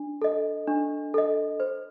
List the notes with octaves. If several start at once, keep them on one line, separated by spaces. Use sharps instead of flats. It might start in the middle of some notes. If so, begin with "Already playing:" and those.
Already playing: D4
A4 D#5
D4
A4 D#5
C5